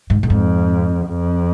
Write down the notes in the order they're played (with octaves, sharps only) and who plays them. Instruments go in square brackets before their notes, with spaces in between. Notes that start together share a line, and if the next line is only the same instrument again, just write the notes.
[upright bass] G#2
A2
[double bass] F2 [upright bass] G#2
[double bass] F2